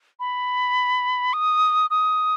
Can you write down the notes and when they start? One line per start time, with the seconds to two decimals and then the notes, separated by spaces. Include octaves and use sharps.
0.20 B5
1.33 D#6
1.90 D#6